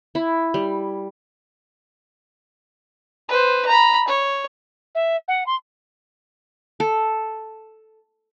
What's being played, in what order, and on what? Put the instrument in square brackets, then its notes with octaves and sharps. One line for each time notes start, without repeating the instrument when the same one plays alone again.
[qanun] E4
G3
[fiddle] B4 C5
A#5 B5
C#5
[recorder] E5
F#5
C6
[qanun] A4